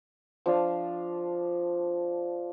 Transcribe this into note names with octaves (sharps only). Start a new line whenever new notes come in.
F3 D4 F5